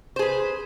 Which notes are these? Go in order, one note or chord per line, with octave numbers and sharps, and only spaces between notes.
G#4 B4 C5